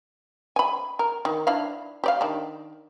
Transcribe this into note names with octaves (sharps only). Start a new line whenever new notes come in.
G#5 B5
A#4
D#3
D4 E4 F5
G4 D5 F5
D#3 D4